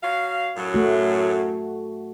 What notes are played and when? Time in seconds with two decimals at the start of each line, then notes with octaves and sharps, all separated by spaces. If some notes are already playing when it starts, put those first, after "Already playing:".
0.02 F#3 C#5 F5
0.56 F#2 A2 F#3
0.74 A3 F#4